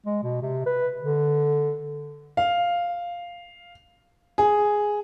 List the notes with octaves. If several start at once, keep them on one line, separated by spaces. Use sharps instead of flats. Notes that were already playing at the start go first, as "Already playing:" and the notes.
G#3
B2
C3
B4
D3
F5
G#4